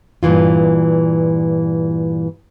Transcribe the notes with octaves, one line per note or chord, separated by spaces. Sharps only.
G2 A#2 E3 F4